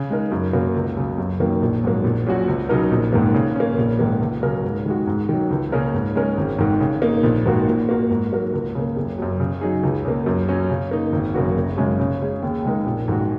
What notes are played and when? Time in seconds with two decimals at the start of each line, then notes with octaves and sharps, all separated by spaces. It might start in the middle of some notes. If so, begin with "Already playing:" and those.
Already playing: C#3
0.10 G#3 D#4 A#4
0.32 F#2
0.53 C#3 A#3 F#4
0.75 C#2
0.97 C#3 F#3
1.18 F#2
1.40 D#3 F#3 A#3
1.62 A#1
1.84 G#2 F#3 A#3
2.04 A#1
2.27 A#2 F#3 C#4 F#4
2.48 C#2
2.69 C#3 F#3 D#4 A#4
2.91 A#1
3.13 G#2 D#3 A#3
3.34 C#3
3.56 A#3 C#4
3.78 A#1
3.99 G#2 D#3 A#3
4.21 C#2
4.42 C#3 F#3 C#4 A#4
4.64 G#2
4.86 D#3 G#3 F#4
5.07 G#2
5.29 D#3 F#3
5.51 C#2
5.72 C#3 A#3 C#4 A#4
5.94 G#2
6.15 G#3 C#4 A#4
6.37 G#1
6.58 G#2 D#3
6.80 C#3
7.02 A#3 D#4
7.24 A#1
7.46 G#2 D#3 A#3 F#4
7.67 A#2
7.89 A#3 F#4 A#4
8.10 G#2
8.32 F#3 A#3 F#4 A#4
8.53 C#2
8.75 C#3 A#3
8.97 F#1
9.18 F#2 F#3
9.40 C#3
9.61 F#3 D#4 G#4
9.83 C#2
10.05 C#3 A#3
10.26 F#2
10.48 F#3 C#4
10.70 C#3
10.91 A#3 D#4
11.12 G#1
11.34 F#2 C#3 A#3 F#4
11.57 F#1
11.78 F#2 C#3 G#3 C#4
12.00 C#3
12.21 G#3 C#4 G#4
12.43 D#2
12.64 C#3 G#3 D#4 A#4
12.86 A#1
13.08 G#2 D#3 G#3 F#4